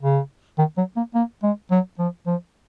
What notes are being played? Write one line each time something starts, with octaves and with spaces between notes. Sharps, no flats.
C#3
D#3
F#3
A#3
A#3
G#3
F#3
F3
F3